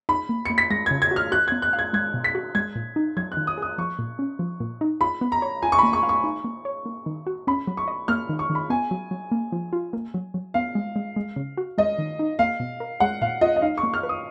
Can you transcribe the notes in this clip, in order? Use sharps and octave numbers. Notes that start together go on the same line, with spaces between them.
D#4 B5
A#3
A#3 C#7
B6
G#3 A#6
C#3 G#6
G#6
F#4
F6
F#4 F#6
B3 G#6
F#6
F5
G#6
G#3 G#6
B2
B6
F#4
G#3 G#6
A#2
D#4
F#3 G#6
F#6
D#3
D#6
G#4 D#6
F3 C#6
A#2
C#4
F3
A#2
D#4
F4 B5
B3
A#5
C#5
F4 G#5
C#6
A#3 B5
C#6
F5
C#6
D#4
A#3
C#5
A#3
D#3
F#4
C#4 B5
F#3
C#6
D#5
A#3 F6
D#3
C#6
D#3
B5
B3 G#5
F#3
F#3
A#3
F3
F4
A#3
F#3
F#3
B3 F5
G#3
G#3
G#3
C#3
F#4
G#3 D#5
D#3
D#4
A#3 F5
B2
A#4
G#3 F#5
A#2 F5
F4 D#5
D#5
D#4 F5
C#6
A#3
F6
B4
D#6